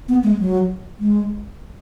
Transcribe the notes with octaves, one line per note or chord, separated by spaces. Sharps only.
B3
G#3
F#3
G#3